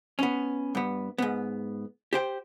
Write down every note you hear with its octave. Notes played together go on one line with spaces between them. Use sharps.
B3 C#4
G2 B3
G#2 B3
G4 C5 G5